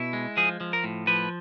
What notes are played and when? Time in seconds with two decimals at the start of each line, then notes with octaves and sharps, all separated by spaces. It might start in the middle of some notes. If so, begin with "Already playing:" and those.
Already playing: B2 E4
0.13 G#3
0.37 F3 G#4
0.61 F3
0.73 A#4
0.84 A2
1.07 F3 B4